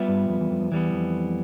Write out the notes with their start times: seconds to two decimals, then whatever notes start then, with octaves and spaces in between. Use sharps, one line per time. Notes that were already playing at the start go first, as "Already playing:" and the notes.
Already playing: G3 B3 F4 B4 E5
0.08 G2
0.29 F2
0.40 E2
0.50 F2
0.61 F2
0.72 E2 E3 G3 B3
0.93 F2